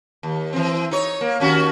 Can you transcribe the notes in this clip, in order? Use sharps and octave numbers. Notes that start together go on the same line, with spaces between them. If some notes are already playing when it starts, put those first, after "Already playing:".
D#2
E3 C4
D#4 C#5
A#3
D#2 C#4 F#4